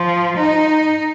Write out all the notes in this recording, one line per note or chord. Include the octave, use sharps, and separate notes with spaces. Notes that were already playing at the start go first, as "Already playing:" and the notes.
Already playing: F3
D#4